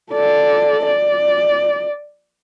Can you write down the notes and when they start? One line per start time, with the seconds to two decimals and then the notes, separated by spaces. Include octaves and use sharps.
0.11 A4 D5
0.87 D5